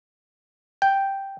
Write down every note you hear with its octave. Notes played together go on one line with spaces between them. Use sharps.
G5